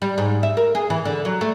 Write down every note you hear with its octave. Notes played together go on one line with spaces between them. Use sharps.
G3
G#2
E5
A#4
G#4
E3
D3
F#3
A3